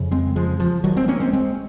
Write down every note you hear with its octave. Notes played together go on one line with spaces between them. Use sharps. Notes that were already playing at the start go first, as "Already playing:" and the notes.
Already playing: F2 C#3
G#3 C4
F3 G#3
F3
D#3 F#3
G#3 C4
A#3 C#4
G#3 C4
G#3 C4